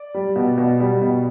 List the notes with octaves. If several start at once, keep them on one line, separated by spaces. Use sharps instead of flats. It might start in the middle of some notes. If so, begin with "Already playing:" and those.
Already playing: D5
G3
B2
B2
G3
B2